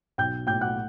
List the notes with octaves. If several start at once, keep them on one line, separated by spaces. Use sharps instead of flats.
B1 G5 G6
A2 G5 G6
F#5 F#6